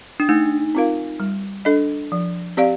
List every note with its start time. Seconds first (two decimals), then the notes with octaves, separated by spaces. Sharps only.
0.20 D4
0.29 A3 D#4
0.75 C4 F4 A#4 F5
1.20 G3
1.65 D4 A4 D#5
2.12 F3
2.57 C4 G4 D5 F5